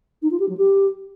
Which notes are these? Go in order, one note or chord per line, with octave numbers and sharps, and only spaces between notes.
D#4
F4
G4
F#3
G4